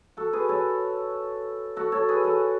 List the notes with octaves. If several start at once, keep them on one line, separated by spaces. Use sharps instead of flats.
F#4 A4
G#4 B4
A4 C#5
F#4 A4
A4 C#5
G#4 B4
F#4 A4